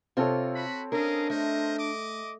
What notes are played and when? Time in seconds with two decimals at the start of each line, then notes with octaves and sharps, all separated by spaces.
0.17 C3 C4 F4 A4 C#5
0.54 F#4 B5
0.92 C#4 D4 G#4 A#4 D#5 F5
1.30 A3 A#4 C5 D#5
1.78 D#5 D6